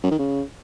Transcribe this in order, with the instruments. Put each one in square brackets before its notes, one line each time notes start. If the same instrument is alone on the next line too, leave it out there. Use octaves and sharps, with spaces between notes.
[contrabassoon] F#2
D#3
C#3